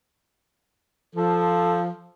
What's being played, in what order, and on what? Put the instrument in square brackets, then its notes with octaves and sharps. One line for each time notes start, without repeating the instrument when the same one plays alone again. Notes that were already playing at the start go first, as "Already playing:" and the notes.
[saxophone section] F3 [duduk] A4